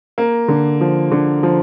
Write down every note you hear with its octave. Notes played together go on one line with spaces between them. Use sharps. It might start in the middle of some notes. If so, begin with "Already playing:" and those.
A#3
D3
F3
D3
F3